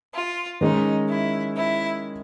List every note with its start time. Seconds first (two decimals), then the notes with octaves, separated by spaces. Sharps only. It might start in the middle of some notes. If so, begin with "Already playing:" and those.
0.14 F4
0.61 D#3 G#3 C#4 D#4
1.09 E4
1.56 E4